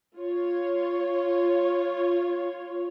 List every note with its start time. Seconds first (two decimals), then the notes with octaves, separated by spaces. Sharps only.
0.16 F4 C#5